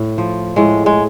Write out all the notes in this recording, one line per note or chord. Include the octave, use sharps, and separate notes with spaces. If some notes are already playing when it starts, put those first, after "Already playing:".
Already playing: A2
F3
A2 G#3
G#3